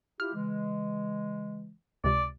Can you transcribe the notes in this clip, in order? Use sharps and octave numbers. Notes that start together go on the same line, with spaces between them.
E4 F4 G4 F6
C#3 E3 G#3
C#2 C3 D5